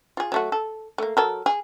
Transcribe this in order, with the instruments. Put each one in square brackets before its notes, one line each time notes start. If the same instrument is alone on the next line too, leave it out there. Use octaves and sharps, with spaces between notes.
[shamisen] F4 G#4
F#3 A3 F#4
A4
A3 A#3
F#3 A4 A#4
G#4